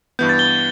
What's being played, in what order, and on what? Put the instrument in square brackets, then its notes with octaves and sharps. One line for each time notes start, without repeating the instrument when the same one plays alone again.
[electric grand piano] G2 E3 B3 [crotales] G6
[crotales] A6
G7